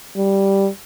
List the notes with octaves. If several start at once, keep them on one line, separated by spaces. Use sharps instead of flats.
G3